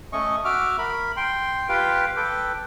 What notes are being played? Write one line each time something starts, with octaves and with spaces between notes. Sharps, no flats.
A3 C#4 D#5 C#6
F#4 E5 D6 F6
A#4 B5
G5 C6
F4 G4 B4 F5 G5
A4 B4 G5 D6